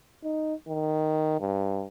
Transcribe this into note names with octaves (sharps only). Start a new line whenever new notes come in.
D#4
D#3
G2